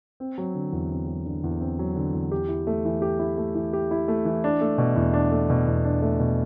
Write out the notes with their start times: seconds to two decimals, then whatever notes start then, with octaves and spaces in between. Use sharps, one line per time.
0.20 C4
0.38 F#3
0.55 D3
0.73 E2
0.90 C4
1.07 F#3
1.26 D3
1.44 E2
1.60 C4
1.79 F#3
1.96 D3
2.14 E2
2.32 G4
2.49 E4
2.67 A3
2.85 E3
3.02 G4
3.19 E4
3.37 A3
3.55 E3
3.73 G4
3.91 E4
4.08 A3
4.25 E3
4.44 D4
4.61 A3
4.78 B2
4.96 E2
5.14 D4
5.32 A3
5.50 B2
5.67 E2
5.85 D4
6.02 A3
6.19 B2